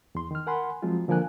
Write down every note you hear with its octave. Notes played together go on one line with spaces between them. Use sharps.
E2 C6
D#3 F6
A#4 F#5 G#5 B5 C6
F3 F#3 G#3 C4 F4
D3 F3 A#3 A#4 G#5 F#6